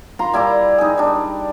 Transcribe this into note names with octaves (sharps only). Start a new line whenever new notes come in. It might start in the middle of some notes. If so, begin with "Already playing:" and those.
F4 A#5 C6
G3 E4 D5 A#5
D#4 G#4
G3 D4